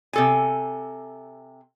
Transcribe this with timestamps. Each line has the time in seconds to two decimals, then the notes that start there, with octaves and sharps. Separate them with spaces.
0.13 C3 A4 G#5